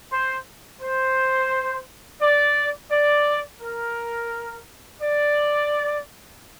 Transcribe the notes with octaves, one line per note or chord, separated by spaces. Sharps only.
C5
C5
D5
D5
A#4
D5